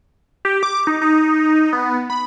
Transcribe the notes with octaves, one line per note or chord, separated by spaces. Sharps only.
G4
D6
D#4
D#4
B3
B5